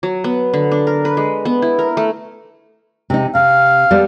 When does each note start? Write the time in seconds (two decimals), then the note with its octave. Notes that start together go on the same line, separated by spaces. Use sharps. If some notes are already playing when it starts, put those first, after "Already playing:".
0.03 F#3
0.24 B3
0.53 D3
0.72 D4
0.87 A#4
1.05 B4
1.17 G#3
1.45 B3
1.62 E4
1.79 A#4
1.97 A3
3.10 C3 C4 D#4
3.35 C3 F5
3.91 G3 B3 A4